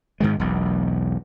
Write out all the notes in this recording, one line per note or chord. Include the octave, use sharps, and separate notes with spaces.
G#2 D#3 G#3
E1 B1